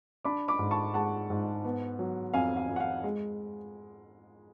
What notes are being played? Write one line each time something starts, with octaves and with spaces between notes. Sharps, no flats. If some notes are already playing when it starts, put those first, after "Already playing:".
D4 B5 D6
B5 D6
G#2
A5 C#6
G#3 F#5 A5
G#2
B3
F#3
F2 F5 G#5
F5
F2
F#5
F5
G#3